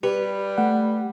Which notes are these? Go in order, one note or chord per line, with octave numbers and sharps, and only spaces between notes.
G3 G4 B4
A3 F#5